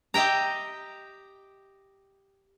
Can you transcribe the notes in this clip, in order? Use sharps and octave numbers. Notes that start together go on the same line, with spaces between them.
G4 D#5 E5 G5 A#5